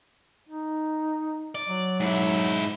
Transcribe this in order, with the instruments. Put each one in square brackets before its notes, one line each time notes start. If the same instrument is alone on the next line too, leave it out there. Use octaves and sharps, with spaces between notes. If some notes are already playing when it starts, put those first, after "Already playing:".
[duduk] D#4
[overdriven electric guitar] D5
[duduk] F#3
[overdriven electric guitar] G#2 E4